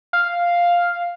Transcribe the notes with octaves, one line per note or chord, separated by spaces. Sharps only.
F5